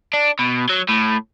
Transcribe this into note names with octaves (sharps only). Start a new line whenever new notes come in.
D4
B2
F#3
A2